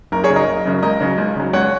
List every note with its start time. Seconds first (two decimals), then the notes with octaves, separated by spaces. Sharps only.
0.12 F#1 A#4
0.24 G#4 C#5
0.30 F#2 C#3 F#3
0.36 A#4 D#5
0.47 F#1
0.65 F#2 C#3 F#3
0.82 C#2 A#4 D#5
1.00 C#3 F#3
1.18 C#2
1.36 C#3 F#3
1.53 C#2 C#5 F#5